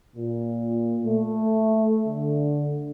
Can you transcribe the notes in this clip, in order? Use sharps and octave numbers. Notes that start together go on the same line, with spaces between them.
A#2
A3
D3